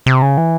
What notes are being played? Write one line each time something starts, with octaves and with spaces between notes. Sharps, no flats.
C3
C#3
E3